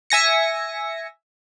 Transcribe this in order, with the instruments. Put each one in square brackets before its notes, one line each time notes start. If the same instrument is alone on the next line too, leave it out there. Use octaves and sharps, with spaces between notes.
[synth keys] E5 G#5 A#6 C#7